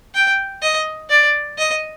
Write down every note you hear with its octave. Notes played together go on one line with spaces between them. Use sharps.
G5
D#5
D5
D#5